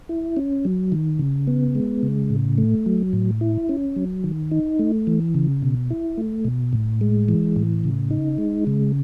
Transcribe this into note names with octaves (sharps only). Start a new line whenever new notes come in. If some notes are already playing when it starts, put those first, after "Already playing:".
E4
C#4
F#3
D#3
C#3
B3
G#3
C#3
A2
A3
F#3
A2
E4
C#4
F#3
D#3
D#4
A3
E3
C#3
B2
E4
A3
B2
A2
G#3
E3
A2
C#3
D#4
G#3
C#3